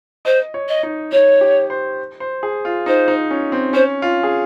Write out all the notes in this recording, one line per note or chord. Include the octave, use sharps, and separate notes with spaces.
C5 D#5
C#5
D#5
D#4
D#4 C#5
G4
C5
C5
G#4
F4
D#4 C5
D#4
C#4
C4
C#4 C5
F4
G#4